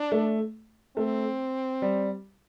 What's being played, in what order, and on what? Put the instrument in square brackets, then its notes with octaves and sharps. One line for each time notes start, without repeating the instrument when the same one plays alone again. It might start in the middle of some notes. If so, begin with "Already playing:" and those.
Already playing: [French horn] D4
[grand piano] A3
[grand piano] A3 [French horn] C4
[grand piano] G3